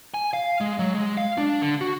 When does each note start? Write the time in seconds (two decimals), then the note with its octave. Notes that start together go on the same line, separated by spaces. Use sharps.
0.14 G#5
0.33 F5
0.61 G#3
0.79 F#3
0.95 G#3
1.17 F5
1.38 D4
1.62 D3
1.81 F#4